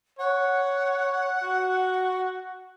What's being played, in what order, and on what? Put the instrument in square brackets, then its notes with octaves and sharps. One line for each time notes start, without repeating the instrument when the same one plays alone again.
[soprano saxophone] C#5 [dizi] F#5
[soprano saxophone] F#4